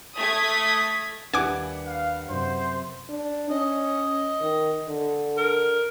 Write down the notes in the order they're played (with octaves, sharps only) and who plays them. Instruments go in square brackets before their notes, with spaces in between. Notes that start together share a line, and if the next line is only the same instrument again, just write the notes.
[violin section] A3 D#6 G#6 B6
[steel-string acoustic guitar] D#2 D4 B4 [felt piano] G3 E4 F#5 [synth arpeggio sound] G#5 D6
[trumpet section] F5
[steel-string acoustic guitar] F#2 C3 [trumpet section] C5
[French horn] D4
[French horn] C#4 [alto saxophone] D#5
[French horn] D#3
D3
[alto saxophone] A#4